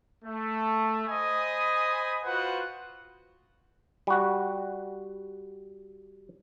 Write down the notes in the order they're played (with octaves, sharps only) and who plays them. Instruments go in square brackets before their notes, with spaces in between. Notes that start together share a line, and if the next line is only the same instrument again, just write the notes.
[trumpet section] A3
C5 D#5 G#5 B5 D#6
F4 F#4 B4 C5 F#5
[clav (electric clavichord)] G3 F#4